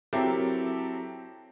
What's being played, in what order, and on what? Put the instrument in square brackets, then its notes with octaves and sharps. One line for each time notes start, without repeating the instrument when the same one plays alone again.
[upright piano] F#3 C4 E4 G4 A4 A#4